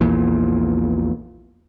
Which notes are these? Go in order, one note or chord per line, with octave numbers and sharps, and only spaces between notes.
A#1 E2 A#2 E3